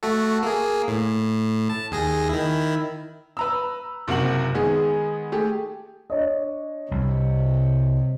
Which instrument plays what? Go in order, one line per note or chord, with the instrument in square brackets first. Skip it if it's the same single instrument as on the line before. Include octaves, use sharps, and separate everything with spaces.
[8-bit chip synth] A3 F#4 A4
A#3 G#4
A2
A5
D#2 G#4 A#6
D#3 E4
[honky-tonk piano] B4 A#5 E6
F#1 C3 A#3 F#4 F#5 F#7
D#3 G#3 B3 G#4
A3 G4 G#4
[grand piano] D4 C#5 D#5
[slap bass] C2 [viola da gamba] C3